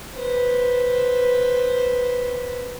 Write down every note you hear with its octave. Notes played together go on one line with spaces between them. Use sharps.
B4 C5